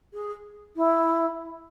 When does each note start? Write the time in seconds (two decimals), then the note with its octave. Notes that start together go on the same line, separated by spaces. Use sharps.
0.14 G#4
0.76 E4